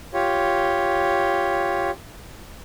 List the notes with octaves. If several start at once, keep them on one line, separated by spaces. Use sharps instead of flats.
F4 G4 C#5